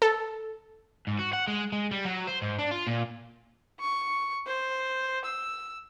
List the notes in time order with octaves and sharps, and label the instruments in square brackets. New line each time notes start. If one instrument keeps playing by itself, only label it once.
[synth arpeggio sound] A4
[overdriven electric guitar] G#2
F#4
F#5
G#3
G#3
G3
F#3
C5
G#2
D4
F4
A#2
[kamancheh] C#6
C5
E6